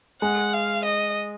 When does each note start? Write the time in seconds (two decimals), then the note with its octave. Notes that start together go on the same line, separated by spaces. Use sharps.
0.21 G#3 F#5
0.53 F5
0.85 D#5